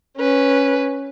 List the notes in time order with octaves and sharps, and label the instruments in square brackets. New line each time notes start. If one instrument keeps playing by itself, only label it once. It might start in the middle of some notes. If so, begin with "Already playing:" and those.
[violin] C#4 B4